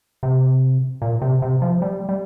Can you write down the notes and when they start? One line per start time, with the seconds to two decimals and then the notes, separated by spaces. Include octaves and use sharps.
0.23 C3
1.02 A#2
1.22 C3
1.42 C3
1.62 F3
1.82 G3
2.09 G3